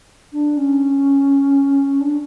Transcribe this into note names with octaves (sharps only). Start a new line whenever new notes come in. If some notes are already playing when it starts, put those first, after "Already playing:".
D4
C#4
D4